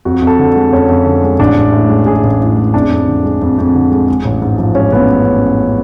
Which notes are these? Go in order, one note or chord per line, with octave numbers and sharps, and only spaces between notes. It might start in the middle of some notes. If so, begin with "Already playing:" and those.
F2 F#4
F2
A4
D3
G#3
F2 C#4
F2
D3
G#3
A1 D4
A1
A2
G#3
A1 G#4
A1
A2
G#3
F2 D4
F2
D3
G#3
F2
F2
D3
G#3
G#3
A1
G#2
F3
G#3 C#4
A1 B3